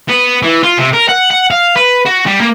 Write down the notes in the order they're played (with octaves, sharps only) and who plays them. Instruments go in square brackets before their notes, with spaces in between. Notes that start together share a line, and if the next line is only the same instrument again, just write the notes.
[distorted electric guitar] B3
E3
F4
C3
A#4
F#5
F#5
F5
B4
F#4
G3
A#3